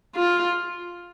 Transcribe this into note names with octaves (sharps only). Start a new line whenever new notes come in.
F4